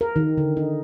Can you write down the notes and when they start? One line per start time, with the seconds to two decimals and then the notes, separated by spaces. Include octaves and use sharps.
0.01 A#4
0.16 D#3
0.37 D3
0.57 D#4